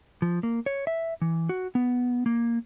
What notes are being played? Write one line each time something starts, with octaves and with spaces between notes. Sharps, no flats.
F3
A#3
C#5
E5
E3
F#4
B3
A#3